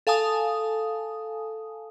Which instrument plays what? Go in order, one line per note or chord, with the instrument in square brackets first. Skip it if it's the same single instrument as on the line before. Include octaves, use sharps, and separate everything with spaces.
[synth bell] A4 F5 G#5 A5 D#6